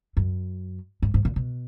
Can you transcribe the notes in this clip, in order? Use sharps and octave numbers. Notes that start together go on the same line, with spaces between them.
F#2
G#2
G#2
A#2
B2